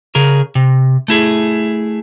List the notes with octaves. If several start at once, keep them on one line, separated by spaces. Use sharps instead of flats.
C#3 G#4 A#4
C3
A3 E4 G#4